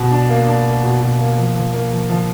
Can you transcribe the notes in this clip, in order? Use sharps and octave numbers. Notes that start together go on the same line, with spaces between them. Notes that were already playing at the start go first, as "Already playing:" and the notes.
Already playing: B2
D4
A#3
D4
A#3
B2
B2
A#3
F3
F3
A#3
F3
F3